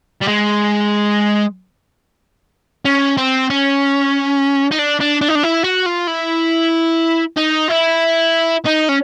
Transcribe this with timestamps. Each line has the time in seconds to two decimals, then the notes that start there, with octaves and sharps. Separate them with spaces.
0.21 G3
0.27 G#3
2.85 C#4
3.17 C4
3.50 C#4
4.71 D#4
4.79 D4
5.00 D4
5.21 D4
5.29 D#4
5.35 D4
5.43 E4
5.64 F#4
5.86 F4
6.07 E4
7.37 D#4
7.69 E4
8.66 D#4
8.89 C#4